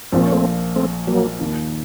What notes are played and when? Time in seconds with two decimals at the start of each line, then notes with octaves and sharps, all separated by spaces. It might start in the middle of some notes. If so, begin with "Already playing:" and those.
0.12 A#1 A#2 F3 C4
0.23 C#4
0.32 A3 C4
0.76 A3 C4
1.07 F#3 A#3
1.39 D#2 D#3 A#3